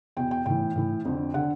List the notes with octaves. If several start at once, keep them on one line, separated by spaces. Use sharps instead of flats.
E2 B2 G5
G5
A2 E3 G5
A2 E3
F2 D3
D3 F#5